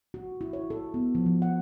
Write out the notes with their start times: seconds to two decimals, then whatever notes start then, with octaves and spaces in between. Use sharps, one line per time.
0.14 F#4
0.41 E4
0.53 C#5
0.70 A4
0.94 B3
1.15 F3
1.26 F3
1.42 F#5